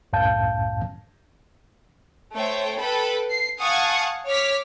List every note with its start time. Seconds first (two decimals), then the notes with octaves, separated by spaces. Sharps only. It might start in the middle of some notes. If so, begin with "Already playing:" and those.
0.13 C2 F#2 A2 F5 A5 G6
2.34 A3 C5 C#5 G5
2.79 A4 B4 G5 A5 B5
3.30 C7
3.60 F5 F#5 G#5 A5 C#6 D#6
4.27 C#5 D6 F6 B6